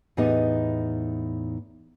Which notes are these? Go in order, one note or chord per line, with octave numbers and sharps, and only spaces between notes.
E2 A2 B3 D#4 G4 D#5